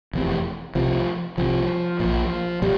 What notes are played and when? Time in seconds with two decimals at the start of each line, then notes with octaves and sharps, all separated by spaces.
0.13 F1 E2 C3
0.75 C2 C3 F3
1.38 C2 C3 F3
2.00 A#1 A#2
2.62 A#2 G3